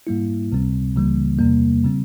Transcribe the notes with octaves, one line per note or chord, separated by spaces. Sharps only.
G#2 G3 A#3 E4
C#2 C3 G3 C4
C#2 C#3 E3 G3 A#3
E2 C3 G3 A#3
C#3 G3 C4